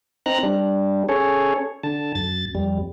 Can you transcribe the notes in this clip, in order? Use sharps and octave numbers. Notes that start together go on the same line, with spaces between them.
C4 D#4 A#5 F#6
G3 D4
C#4 G#4 A4 C#5
D3 A5
F#2 A6
F2 G3